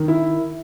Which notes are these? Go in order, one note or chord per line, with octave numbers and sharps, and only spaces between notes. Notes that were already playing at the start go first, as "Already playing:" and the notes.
Already playing: D#3
E4